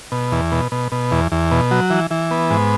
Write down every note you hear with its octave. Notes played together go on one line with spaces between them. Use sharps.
B2
E2
B2
B2
B2
E2
E2
B2
F#3
E3
E3
B3
G#2